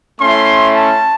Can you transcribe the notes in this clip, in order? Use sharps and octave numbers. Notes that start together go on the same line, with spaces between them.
A3 C#4 E4 C6
A5